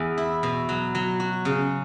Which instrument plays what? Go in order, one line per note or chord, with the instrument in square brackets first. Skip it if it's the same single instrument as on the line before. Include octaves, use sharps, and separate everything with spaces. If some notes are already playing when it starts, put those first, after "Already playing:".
Already playing: [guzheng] E2
E4
B2
F#3
F#3
F#4
C#3